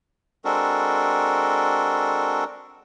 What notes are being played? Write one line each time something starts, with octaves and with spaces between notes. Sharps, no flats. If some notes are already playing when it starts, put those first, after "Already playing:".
G#3 C4 D4 F#4 A4 A#4